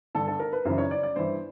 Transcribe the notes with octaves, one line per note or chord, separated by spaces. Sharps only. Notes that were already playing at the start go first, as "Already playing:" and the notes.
G2 D3 A4
A4
A#4
B4
F#2 C#3 E3 C5
C#5
D5
D5
G2 E3 C5